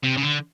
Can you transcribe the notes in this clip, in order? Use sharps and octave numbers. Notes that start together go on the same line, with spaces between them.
C3
C#3
D3